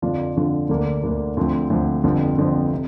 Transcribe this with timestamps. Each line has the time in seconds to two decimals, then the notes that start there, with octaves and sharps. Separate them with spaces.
0.02 F2 D3 F3 D4 F4
0.36 F2 D3 F3 D4 F4
0.69 D2 D3 A#3 D4
1.03 D2 D3 A#3 D4
1.37 D2 D3 F3 C4
1.70 D2 D3 F3 C4
2.04 G1 F2 D3 F3 C4
2.37 G1 F2 D3 F3 C4
2.72 C3